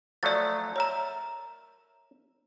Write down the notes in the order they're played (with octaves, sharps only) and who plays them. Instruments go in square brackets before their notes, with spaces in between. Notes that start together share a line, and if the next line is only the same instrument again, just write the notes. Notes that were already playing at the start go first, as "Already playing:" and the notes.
[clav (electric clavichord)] F3 F#3 A3 [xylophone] D5 A6
[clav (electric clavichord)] A#4 E5 [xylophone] C#5 A#5